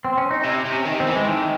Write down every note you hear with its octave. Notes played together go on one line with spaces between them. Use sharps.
C4
C#4
D#4
C3 E4
C3
C#4
D#3
C4
E3
G#3
D#3 A3